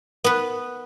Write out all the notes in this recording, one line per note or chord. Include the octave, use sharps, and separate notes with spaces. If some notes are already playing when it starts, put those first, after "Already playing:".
B3 B4